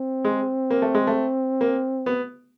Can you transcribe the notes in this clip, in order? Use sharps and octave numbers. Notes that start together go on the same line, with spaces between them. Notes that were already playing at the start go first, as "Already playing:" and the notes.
Already playing: C4
G#3
A#3
A3
G#3
A3
A#3
B3